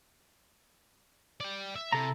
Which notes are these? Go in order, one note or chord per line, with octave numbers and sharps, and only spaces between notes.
D5 G5
E5
C3 E4 A4 A#5